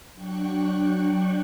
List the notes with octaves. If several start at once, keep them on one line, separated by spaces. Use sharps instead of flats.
F#3 D4 G5 C#6 F#6